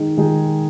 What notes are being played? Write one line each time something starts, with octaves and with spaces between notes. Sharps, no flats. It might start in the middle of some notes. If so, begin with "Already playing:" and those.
Already playing: D#3 G#3 D#4 G#4
D#3 G#3 D#4 G#4